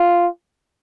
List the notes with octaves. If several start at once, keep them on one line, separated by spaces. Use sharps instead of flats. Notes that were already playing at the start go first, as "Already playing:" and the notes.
Already playing: F4